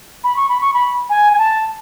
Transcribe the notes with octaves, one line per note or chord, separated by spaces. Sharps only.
B5
C#6
B5
C#6
B5
G#5
G#5
A5